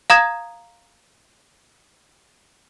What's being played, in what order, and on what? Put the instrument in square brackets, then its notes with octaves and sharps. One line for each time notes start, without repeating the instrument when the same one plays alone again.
[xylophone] F5 A#5 D#6 G#6